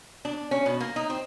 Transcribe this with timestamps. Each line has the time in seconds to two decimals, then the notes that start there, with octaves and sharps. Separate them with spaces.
0.25 D4
0.51 C#4
0.66 B2
0.80 A#3
0.96 D#4
1.10 C4